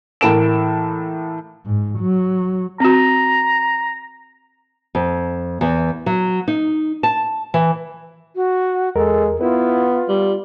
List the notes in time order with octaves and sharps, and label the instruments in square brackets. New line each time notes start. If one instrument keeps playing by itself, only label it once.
[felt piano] A2 E3 A#3 A4 D7 E7
[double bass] G#2
F#3
[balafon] C4 F#4 [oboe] A#5
[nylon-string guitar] F2
E2
F#3
D#4
A5
E3
[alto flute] F#4
[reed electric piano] E2 A#4 [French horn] G#3 [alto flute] A4
[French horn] B3 [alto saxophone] E4 [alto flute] F4 [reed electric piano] B4
[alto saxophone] G3